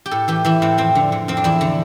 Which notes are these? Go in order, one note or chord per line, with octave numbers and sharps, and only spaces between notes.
G4
A2 A4
E3 G4
E3 E4
A2 C4
F2 C4
D3
D3
F2 C4
D4
E2 E4
D3